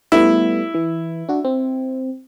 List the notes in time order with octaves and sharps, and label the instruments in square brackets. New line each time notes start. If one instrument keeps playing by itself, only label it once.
[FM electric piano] G3 A3 B3 [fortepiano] E4
[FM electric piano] E3
D4 F#4
C4